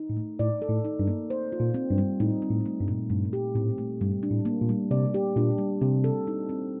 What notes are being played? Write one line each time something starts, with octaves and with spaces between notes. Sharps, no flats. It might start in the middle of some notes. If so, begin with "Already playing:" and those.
Already playing: D#4
A2
A3
A2 D5
A4
A2
D#4
G2
A#3
C5
F4
A#2
C4
G2
G3
A2 D#4
C4
A2
A3
G2
A#2
G2 A3
G4
A2 C4
A3
G2 G3
D4
A2
A#3
A#2
G3
C3 D5
G4
A#2 D4
G3
C3 C4
A4
D#4
C4